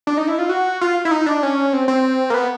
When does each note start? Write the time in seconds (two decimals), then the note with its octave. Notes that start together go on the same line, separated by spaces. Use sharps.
0.07 D4
0.17 D#4
0.28 E4
0.39 F4
0.49 F#4
0.81 F4
1.05 E4
1.11 D#4
1.26 D4
1.43 C#4
1.73 C4
1.88 C4
2.30 A#3
2.34 B3